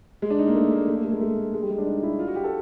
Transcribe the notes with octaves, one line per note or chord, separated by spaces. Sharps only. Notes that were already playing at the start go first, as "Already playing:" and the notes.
G#3
D4
D#4
A#3
A3
A#3
A3
A#3
A3
G#3
A3
G#3
G3
G#3
D4
D#4
E4
F4
F#4
G4
A4